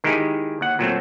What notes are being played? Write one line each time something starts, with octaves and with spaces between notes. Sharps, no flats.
D#3 G#3 D#4 E4 G4 G#4
D#2 F#5
A#2 F#3 A3 C4